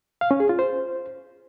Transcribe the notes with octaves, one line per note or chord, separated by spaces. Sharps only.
F5
C#4
G#4
F4
C5